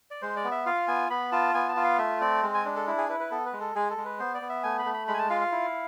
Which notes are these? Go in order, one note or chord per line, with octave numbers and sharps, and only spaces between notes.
D5
G#3 C5
D5
B3
E5
F4 F5
B3 G#5
B3 B5
F4 A5
B3 G#5
A5
F4
F5
A3 E5
C4 D5
G#3
G#5
D4
A4
E4
G#4
E4 B4
B4
B3 A4
B4
G#3
A4
G#3 G#4
A4
G#3
B4
B3 C5
D5
B3
E5
A3 G#5
B5
A3
B5
G#3 B5
G#5
A5
F4 F5
F5
E4